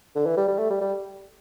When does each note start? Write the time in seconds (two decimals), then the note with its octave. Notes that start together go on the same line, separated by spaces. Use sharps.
0.15 D3
0.26 E3
0.37 G3
0.48 G3
0.58 A3
0.70 G3
0.81 G3